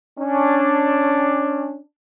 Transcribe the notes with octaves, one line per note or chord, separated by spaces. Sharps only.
C#4 D4